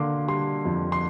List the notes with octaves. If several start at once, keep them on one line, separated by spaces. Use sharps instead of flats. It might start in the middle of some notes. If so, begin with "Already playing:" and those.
Already playing: D3 A#3 C6 D6
G3 C6
F2
C6